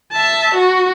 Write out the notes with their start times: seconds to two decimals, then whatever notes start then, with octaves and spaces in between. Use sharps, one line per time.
0.12 E5 A5
0.54 F#4